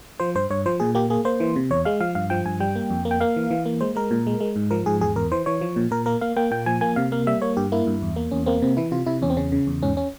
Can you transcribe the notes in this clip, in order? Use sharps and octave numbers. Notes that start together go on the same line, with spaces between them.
F3 C5
G2 C5
G2 C#5
F3 C5
A#2 G#4
A#3 G4
A#3 G#4
A#3 C5
E3
C3
E2 C#5
G#3 F5
F3 F5
G2 F5
F3 G5
G2 G#5
G3 G5
A#3
F2
A#3
G5
A#3 F5
E3
E3
A#3
G#3 C5
G#3 A#4
A#2
G#3
G#3
G#2
F3 A#4
G#2 G#4
E2 G#4
E2 A#4
E3 C5
E3 C#5
F3
A#2
A#2 A#4
A#3 A#4
A#3 F5
A#3 G5
A#2 G5
F3 G#5
A#3 G#5
C3 F5
A#3 F5
G3 E5
A#3 C#5
G2 G4
A#3 E4
G2
E2
A#3
E2 C#4
A#3 C4
C3 C4
E3 E4
C3 F4
C3 E4
E2 C#4
C4
C#3 C#4
C#3
E2
G#2 C#4
C#4